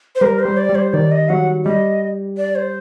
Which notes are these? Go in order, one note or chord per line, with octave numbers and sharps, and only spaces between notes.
C5
G3 A#4
C5
G3
D5
G3
C5
D#3 D5
D#5
F#3 F#5
G3 D#5
D5
C5